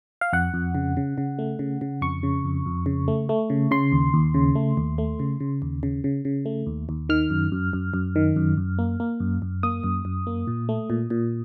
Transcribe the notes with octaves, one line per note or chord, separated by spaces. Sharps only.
F5
F2 F#5
F2
C#3
C#3
C#3
A3
C#3
C#3
F2 C#6
C#3
F2
F2
C#3
A3
A3
C#3
C#3 C6
D#2
D#2
C#3
A3
D#2
A3
C#3
C#3
D#2
C#3
C#3
C#3
A3
D#2
D#2
D#3 F6
F#2
F#2
F#2
F#2
D#3
F#2
F#2
A#3
A#3
F#2
F#2
A#3 D#6
F#2
F#2
A#3
A#2
A3
A#2
A#2